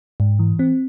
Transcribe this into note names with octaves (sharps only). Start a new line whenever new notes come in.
G#2
E3
C4